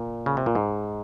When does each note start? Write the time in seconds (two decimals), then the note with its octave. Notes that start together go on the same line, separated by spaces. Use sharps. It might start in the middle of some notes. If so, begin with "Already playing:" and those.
Already playing: A#2
0.26 C#3
0.37 C3
0.46 A#2
0.55 G#2